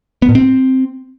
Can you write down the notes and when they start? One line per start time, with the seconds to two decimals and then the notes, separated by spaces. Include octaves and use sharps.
0.22 B3
0.29 A2
0.35 C4